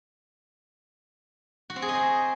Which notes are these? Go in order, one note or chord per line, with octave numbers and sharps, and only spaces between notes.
F#4
C4
G#4
D#5
C5